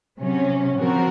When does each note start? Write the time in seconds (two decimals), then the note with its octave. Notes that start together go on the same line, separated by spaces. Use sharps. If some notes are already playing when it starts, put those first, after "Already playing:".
0.20 C3 F#3 C#4
0.78 C#3 F3 C4 F#4 A#4